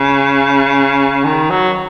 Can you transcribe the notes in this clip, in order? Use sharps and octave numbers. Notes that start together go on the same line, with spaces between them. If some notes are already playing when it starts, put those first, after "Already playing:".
Already playing: C#3
D#3
F#3